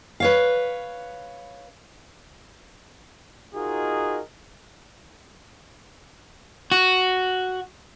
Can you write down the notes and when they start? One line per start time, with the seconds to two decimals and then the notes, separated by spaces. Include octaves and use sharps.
0.20 B4 C#5 F5
3.55 D#4 F4 F#4 G#4 A#4 D#5
6.72 F#4